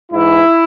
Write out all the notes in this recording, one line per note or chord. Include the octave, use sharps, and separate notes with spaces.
G#2 E3 E4